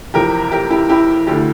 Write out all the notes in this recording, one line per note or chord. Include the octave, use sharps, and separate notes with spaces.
F2 C3 E3 G4 A#4
G4 A#4
E4 G4
E4 G4
D2 D3 E4 G4